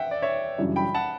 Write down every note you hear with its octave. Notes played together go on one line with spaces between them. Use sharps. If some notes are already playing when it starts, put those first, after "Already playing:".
Already playing: E5 F#5 G5
D5
C#5 E5
F#2 C#3 E3 G3 D4
G5 B5
F#5 A5